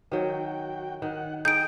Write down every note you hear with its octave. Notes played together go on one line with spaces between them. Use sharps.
D#3 F#3 F#4 G5
D#3 F#5
D#4 G#4 G5 D#6 G6 D7